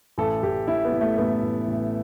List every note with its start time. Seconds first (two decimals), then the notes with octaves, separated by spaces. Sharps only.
0.18 A1 A4
0.43 A1 G4
0.67 A2 E4
0.85 B3
0.92 A2
1.01 A3
1.18 A1 B3
1.43 A1
1.67 A1